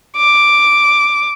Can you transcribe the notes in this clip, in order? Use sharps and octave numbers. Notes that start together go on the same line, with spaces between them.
D6